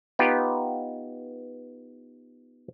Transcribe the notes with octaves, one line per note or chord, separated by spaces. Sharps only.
B3 D#4 F4 G4 B4